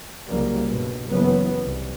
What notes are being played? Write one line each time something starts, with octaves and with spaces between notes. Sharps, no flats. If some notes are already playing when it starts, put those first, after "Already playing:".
C2 C#3 F#3 G3 A#3
G2 B2
F#1 E3 F#3 B3
C2